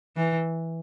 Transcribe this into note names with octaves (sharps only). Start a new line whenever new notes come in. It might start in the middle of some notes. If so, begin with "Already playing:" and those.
E3